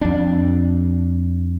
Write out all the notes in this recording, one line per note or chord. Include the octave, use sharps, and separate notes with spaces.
F2 D4